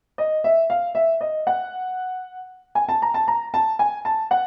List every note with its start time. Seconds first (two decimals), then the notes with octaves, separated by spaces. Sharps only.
0.18 D#5
0.44 E5
0.70 F5
0.95 E5
1.21 D#5
1.47 F#5
2.75 G#5
2.89 A5
3.02 A#5
3.14 A5
3.28 A#5
3.54 A5
3.79 G#5
4.05 A5
4.31 F#5